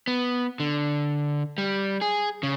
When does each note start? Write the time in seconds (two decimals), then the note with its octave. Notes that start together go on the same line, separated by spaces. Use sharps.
0.07 B3
0.60 D3
1.58 G3
2.01 G#4
2.43 C#3